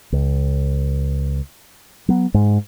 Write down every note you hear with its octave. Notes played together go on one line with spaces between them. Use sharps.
C#2
F#3 B3
G#2 G#3